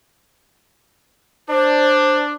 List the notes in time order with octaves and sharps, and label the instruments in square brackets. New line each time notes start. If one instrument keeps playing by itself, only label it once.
[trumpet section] D4 [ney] C5